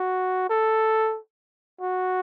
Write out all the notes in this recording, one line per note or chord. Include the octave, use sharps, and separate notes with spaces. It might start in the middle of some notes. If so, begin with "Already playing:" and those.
Already playing: F#4
A4
F#4